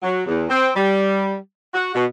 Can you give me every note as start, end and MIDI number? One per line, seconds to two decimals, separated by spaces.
0.03 0.21 54
0.26 0.44 40
0.49 0.70 60
0.75 1.35 55
1.74 1.93 66
1.94 2.04 47